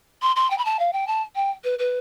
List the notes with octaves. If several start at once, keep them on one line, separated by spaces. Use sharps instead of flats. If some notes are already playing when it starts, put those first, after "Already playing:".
C6
C6
G5
B5
A5
F5
G5
A5
G5
B4
B4